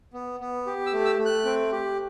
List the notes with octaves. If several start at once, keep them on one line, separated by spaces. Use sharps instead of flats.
B3
B3
G4
E6
A3
E6
A3
F#6
C4
G4